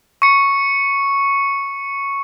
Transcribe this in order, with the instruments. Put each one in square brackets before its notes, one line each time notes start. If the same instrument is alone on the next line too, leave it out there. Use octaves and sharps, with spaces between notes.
[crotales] C#6 C#7